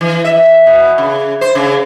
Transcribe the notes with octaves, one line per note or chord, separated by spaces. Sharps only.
E3
E5
B2
C#3
C5
C#3